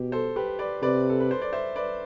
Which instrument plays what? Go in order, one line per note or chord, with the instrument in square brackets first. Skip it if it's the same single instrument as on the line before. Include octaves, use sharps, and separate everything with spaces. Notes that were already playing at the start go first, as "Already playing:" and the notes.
Already playing: [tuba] B2 [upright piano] G4
[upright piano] A4 C5
G4 B4
B4 D5
[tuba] C3 [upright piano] B4 D5
[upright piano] A4
B4
C5
D5
C5 E5
B4 D5